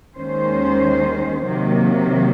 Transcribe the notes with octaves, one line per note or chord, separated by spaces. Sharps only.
D#2 D#3 G#3 C#4 C5
C3 D#3 F#3 A#3